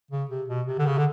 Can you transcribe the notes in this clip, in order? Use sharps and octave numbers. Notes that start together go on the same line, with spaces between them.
C#3
C3
B2
C3
D3
C#3
D3